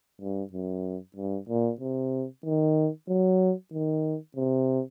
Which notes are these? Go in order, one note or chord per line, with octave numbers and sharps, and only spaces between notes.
G2
F#2
G2
A#2
C3
D#3
F#3
D#3
C3